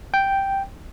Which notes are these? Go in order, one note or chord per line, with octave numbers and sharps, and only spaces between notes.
G5